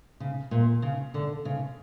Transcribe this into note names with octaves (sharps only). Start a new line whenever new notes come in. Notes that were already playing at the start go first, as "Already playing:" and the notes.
C#3
A#2
C#3
D3
C#3